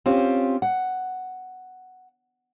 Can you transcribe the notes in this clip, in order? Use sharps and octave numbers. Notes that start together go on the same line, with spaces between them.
C4 C#4 F4 G4
F#5